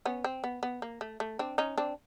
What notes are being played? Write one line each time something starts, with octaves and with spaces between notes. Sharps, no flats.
B3 C#4
C4
B3
B3
A#3
A3
A3
C4 D4
C#4 D#4
C4 D4